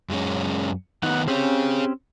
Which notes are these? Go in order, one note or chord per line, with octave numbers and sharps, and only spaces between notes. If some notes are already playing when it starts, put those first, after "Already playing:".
F#2 G#3 C#4
D#3 B3 D#4 F#5
C4 C#4 G4 G#4 C#5